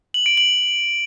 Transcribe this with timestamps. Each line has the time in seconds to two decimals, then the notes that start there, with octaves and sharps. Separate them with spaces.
0.14 F#7
0.26 D7
0.38 F#7